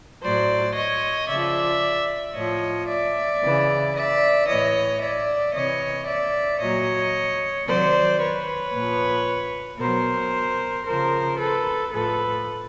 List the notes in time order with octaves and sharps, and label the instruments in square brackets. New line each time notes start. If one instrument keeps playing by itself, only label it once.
[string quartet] A2 F#3 C5 D5
C#5 D#5
C#3 F3 D5 E5
A2 F3 C#5 D#5
D5 E5
C#3 E3
D5 E5
A2 E3 C#5 D#5
D5 E5
C3 E3 C#5 D#5
D5 E5
A#2 F#3 C#5 D#5
C3 D#3 F#3 C5 D5
B4 C#5
A#2 F3
B2 F#3 A#4 C5
C#3 F3 A#4 C5
A4 B4
A2 F3 A4 B4